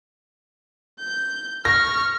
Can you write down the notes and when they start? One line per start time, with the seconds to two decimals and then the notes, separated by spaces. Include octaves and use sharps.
1.00 G6
1.65 C#6 F6 A#6